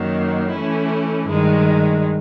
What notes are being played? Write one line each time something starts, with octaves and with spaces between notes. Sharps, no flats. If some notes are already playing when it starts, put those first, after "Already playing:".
Already playing: F#2 D#3 F#3 A#3
E3 A3 C#4 E4
G2 D#3 G#3